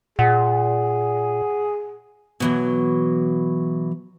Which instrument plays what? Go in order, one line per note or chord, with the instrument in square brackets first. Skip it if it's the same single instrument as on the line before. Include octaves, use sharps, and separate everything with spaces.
[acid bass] A#2 [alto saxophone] G#4 [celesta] F#5
[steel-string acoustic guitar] B2 E3 F#3